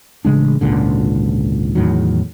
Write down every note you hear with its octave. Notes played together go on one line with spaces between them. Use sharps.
A1 C#3 G#3 D4
G#1 C#2 A#2 D3
E2 A2 D#3 F#3